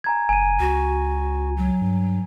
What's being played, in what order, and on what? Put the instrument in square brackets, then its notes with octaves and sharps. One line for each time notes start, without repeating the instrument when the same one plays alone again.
[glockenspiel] G#5 A#5 G#6
[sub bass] F1 [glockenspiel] G#5 D#7
[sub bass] C#2 [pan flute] F#4
[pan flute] F#3
[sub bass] G2